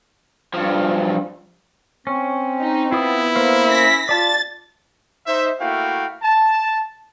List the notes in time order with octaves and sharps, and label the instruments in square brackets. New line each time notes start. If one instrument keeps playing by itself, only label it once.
[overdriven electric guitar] G2 F3
[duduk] C4 [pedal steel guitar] C#4
[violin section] D#4
[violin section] B3 [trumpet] E4 [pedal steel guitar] F4 D#6
[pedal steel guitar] A#3 C5 F5
[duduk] C#4 [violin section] A#6 B6
[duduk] F4 [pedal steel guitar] D5 A5 [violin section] A6
[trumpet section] D#4 C5 E5
A3 A#3 E4 F#4 F5 G5
A5